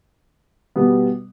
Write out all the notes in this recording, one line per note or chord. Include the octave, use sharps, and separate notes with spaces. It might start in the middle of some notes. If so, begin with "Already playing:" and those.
B2 G3 B3